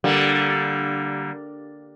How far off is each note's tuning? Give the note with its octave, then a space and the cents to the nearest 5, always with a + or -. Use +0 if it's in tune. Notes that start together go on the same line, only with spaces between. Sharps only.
D3 +0 G3 -15 A#3 +0